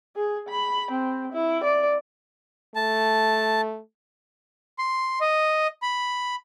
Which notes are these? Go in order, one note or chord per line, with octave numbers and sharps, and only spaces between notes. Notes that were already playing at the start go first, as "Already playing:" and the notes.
G#4
B5
C4
E4
D5
A3 A5
C6
D#5
B5